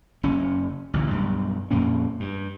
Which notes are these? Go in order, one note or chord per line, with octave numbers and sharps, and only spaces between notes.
F#1 C#4
A1 D2 A#2
B1 G2
F2 A#2 A#3 C#4
G2